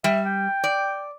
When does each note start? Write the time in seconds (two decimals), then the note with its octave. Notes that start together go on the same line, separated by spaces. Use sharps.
0.04 G3 E5
0.26 G5
0.64 D5